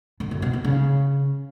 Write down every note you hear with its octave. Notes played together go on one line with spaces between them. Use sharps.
D3
F#2
B2
C#3
C#3